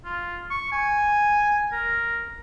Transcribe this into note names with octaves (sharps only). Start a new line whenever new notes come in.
F4
C#6
G#5
A#4